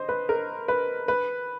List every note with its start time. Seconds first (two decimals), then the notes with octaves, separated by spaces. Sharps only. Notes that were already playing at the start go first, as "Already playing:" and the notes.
Already playing: C5 D#5
0.09 B4
0.29 A#4
0.68 B4
1.08 B4